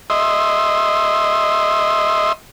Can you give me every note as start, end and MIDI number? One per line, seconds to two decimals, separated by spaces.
0.10 2.33 75
0.10 2.33 76
0.10 2.33 84